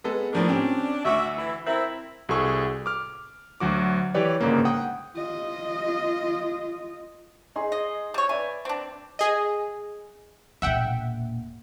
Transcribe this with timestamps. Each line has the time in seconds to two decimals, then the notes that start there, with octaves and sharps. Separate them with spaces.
0.04 G#3 B3 A4
0.33 A2 F3 A#3 D4
0.48 C4 C#4 G4
1.05 D2 F#4 E5 D6 E6
1.37 E3 E4
1.67 C4 E4 A#4
2.29 C2 F#4 G#4 A4 C#6
2.86 D6 F6
3.60 D2 F#3 F#4 D6
4.14 E3 G4 B4 C#5 D5
4.41 G1 G#2 C#3 A#3
4.65 F#5 G5 D#6
5.15 F4 D#5
7.56 D#4 G#4 C6
7.72 D#5
8.14 G3 C#5
8.29 B4 D5 E5 G#5
8.65 C4 D4
9.19 G#4 D#5
10.62 E1 A#2 E5 F#5 G5